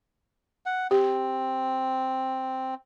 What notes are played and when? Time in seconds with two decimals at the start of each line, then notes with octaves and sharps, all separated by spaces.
0.66 F#5
0.91 C4 G4